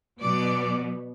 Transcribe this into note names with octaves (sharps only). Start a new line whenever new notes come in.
B2 F#3 B3 D5